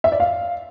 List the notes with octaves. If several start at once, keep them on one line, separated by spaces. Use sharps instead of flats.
E5
D5
F5